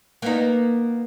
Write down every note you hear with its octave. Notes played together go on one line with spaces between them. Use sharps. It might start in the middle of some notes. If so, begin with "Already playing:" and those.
A#3 B3 D#4